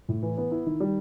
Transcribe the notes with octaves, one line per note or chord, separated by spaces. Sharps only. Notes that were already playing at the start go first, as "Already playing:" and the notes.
A2
E3
B3
E4
D#3
G3